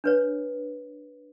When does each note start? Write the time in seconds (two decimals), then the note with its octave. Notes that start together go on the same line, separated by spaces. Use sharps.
0.04 D4 B4 C#5